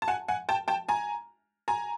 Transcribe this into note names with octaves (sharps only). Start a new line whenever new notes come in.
A5
F#5 G#5
F#5 G#5
G5 A5
G5 A5
G#5 A#5
G#5 A#5